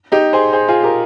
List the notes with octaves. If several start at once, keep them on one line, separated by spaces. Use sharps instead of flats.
D#4 G4
G#4 C5
G#4 C5
F4 G#4
G4 A#4